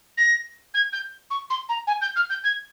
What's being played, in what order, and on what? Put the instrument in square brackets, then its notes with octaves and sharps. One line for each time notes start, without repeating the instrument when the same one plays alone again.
[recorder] A#6
G#6
G6
C#6
C6
A#5
G#5
G6
F6
G6
G#6